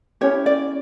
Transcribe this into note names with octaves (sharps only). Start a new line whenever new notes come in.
C#4 E4 G4 C#5
D5